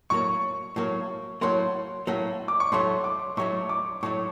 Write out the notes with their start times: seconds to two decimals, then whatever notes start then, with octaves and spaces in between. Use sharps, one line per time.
0.10 A2 F#3 A#3 C#6
0.76 A2 F#3 A#3
1.41 A2 F#3 A#3 C6
2.07 A2 F#3 A#3
2.48 D6
2.60 C#6
2.72 A2 F#3 A3 C6
3.04 D6
3.37 A2 F#3 A3 C#6
3.69 D6
4.03 A2 F#3 A3 C#6